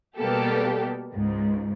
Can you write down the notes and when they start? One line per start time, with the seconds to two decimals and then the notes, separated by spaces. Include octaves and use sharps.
0.18 B2 G3 A#3 B3 G4 A4
1.14 C#2 G#2